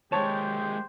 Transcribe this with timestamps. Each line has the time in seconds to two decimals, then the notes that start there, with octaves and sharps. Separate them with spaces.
0.12 D#2 G#3 G4 C5 C#5 A5